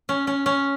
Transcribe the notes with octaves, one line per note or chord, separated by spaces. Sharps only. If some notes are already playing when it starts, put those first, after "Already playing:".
C#4
C#4
C#4